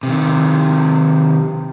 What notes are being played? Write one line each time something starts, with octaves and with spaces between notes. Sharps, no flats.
C3 D#3